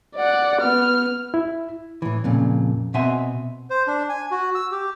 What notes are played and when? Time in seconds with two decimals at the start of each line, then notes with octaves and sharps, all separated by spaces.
0.16 D5 F#5
0.61 B3 F6
1.34 E4
2.02 A2 E3
2.24 F2 A#2 C#3
2.94 B2 C4 E5 F#5 G#5 C6
3.70 C5
3.87 D4
4.09 G#5
4.31 F#4
4.55 E6
4.71 G4